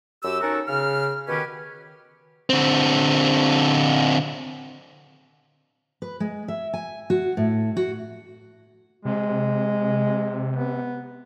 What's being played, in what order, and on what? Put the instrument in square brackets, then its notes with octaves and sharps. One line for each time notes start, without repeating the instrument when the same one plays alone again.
[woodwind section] F#2 G4 E6
C#4 D#4 F#4 A4 A#4
C#3 F6
B2 D#3 C#4 G4 B4
[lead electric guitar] D3 C4
[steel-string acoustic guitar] B4
G#3
E5
G#5
F#4
A2
F#4
[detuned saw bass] C3 [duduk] G#3
[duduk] B3